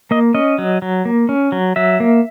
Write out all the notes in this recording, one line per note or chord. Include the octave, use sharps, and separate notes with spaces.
A#3 D#5
C#4 D#5
F#3
F#3
A#3
C#4
F#3
F#3 E5
A#3